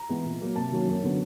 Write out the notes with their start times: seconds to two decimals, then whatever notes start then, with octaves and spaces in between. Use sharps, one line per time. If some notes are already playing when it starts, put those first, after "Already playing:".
Already playing: A#5
0.09 E3 G#3 B3
0.24 A#2
0.41 F#3 A#3
0.56 C3 A5
0.71 D#3 F#3 A#3 C#4
0.87 F#2
1.03 D3 F#3 B3